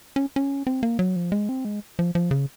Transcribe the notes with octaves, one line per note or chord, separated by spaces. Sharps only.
C#4
C#4
C4
A#3
F#3
F3
G#3
C4
G#3
F3
F3
C#3